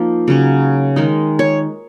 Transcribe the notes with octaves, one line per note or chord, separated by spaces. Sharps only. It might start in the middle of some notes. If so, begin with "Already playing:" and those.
Already playing: F3 A#3 D#4
C#3 F#3 C#4
D#3 G#3 D#4
C#5